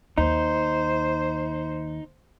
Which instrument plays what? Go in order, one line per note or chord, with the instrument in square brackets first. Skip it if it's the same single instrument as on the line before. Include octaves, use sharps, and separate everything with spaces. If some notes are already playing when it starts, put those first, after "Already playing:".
[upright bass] D#2 [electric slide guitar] D#4 [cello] C5